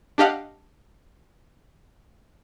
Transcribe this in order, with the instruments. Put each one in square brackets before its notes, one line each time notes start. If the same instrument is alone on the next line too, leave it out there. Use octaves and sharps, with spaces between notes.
[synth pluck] D4 G4 D#5 F5 F#5